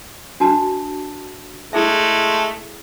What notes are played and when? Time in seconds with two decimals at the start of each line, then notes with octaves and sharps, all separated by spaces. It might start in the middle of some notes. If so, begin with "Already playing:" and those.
0.40 D4 F#4 A5
1.73 G#3 A3 E4 G#4 E5